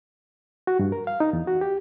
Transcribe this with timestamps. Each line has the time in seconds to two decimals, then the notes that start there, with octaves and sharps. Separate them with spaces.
0.67 F#4
0.79 G2
0.92 A#4
1.07 F5
1.20 D#4
1.33 E2
1.47 F#4
1.61 G4